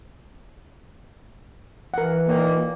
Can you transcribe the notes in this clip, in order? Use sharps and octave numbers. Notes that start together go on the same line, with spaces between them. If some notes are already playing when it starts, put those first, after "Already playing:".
E3 A#4 F#5
A#2 D#3 A#3